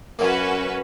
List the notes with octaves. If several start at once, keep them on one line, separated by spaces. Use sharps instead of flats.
F#2 A#3 C#4 F#4 B4